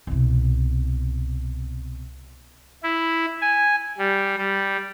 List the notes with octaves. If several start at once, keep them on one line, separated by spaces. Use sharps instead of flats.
C2 B2
E4
G#5
G3
G3